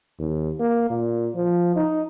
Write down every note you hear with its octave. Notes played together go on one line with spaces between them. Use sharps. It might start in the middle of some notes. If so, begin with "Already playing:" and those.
D#2
A#3
A#2
F3
D#4